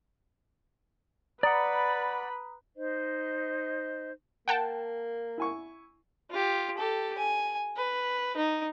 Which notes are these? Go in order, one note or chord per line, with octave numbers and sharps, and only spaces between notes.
B4 D5 F#5 A#5 B5 D#6
D#4 C5 D#5
A#3 F#5 G5 A5
E4 G#5 C#6
F4 G4
G4 A4
G#5
B4
D#4